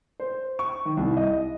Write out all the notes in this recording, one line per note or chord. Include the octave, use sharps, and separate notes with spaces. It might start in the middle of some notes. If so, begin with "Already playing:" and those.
C5
C#6
D#3
C2
D#5